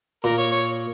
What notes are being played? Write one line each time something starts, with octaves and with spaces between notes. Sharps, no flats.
A#2 A#4
C#5
C#5